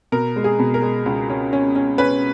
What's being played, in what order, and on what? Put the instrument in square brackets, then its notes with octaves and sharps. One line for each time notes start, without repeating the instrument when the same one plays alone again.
[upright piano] B2 A#4
G#3
G#4
B2
A#4
G#3
C#2
C#4
C#4
C#4
C#4 B4